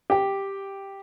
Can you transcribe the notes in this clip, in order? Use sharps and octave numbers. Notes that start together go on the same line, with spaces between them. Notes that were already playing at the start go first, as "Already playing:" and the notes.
G4 G5